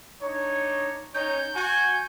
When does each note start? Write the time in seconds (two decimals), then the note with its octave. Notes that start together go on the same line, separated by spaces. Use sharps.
0.22 D4 D#4 C#5
1.14 C#4 D#4 C#5 G6
1.55 F#4 G#5